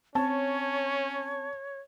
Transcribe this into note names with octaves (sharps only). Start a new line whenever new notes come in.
C4 C#4 C#5 A5